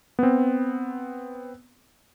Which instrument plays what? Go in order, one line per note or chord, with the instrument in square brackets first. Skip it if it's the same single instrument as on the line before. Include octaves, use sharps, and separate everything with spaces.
[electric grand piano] B3 C4